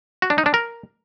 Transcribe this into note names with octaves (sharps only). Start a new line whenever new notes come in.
F#4
D4
D#4
D4
A#4